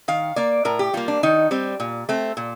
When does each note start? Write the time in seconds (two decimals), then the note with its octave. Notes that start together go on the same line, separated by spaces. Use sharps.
0.08 D#3 F5
0.36 A#3 D5
0.65 A2 A#4
0.79 G4
0.93 G3 A#3 F4
1.08 D4
1.23 D#3 D#4
1.51 G3 C4
1.80 A#2
2.09 A3 C4
2.37 A#2